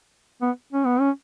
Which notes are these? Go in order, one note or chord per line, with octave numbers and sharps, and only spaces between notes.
B3
C#4
B3
C#4